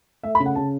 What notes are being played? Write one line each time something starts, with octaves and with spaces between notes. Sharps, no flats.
A3 E5
B5
C#3
F#5
C#3 A5